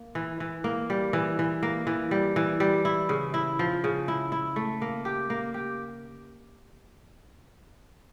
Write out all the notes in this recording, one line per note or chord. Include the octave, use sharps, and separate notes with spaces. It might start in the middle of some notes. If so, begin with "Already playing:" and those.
Already playing: A#3
E3
E3
A#3
G3
E3
E3
A#3
E3
G3
E3
G3
E4
C#3
E4
F3
C#3
E4
E4
A3
A#3
G4
A#3
G4